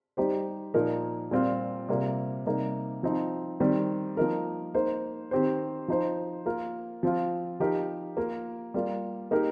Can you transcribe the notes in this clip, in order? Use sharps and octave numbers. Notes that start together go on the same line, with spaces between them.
G3 D#4 G4 C5
A#2 F3 A#3 D#4 A#4
A#2 G3 C4 F4
C3 G3 A#3 F4
C3 G3 A#3 D#4
F3 C4 D#4
D#3 G3 C4 G4
F3 A#3 D#4 A#4
A#3 D#4 C5
D#3 C4 G4 C5
F3 D#4 C5
A#3 F4 A#4
F3 C4 F4
F3 D#4 G4 A#4
A#3 F4 A#4
G3 A#3 F4
A#3 D#4 G4 A#4